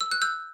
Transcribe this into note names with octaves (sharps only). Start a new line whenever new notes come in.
E6
F#6
E6 G6